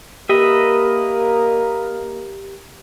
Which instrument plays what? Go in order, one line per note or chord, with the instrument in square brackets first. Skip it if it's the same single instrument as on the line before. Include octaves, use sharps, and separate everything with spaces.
[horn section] A#3 A#4 [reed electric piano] G4 [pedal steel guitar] B4 D#5 E5